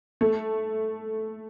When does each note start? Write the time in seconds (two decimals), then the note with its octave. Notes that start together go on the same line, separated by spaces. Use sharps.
0.21 A3